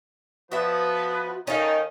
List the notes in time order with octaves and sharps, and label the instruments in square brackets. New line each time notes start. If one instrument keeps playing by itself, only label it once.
[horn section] F3 B3 B4 [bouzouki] F#4 E5
[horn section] D#3 D#4 [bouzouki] C#4 A4 F5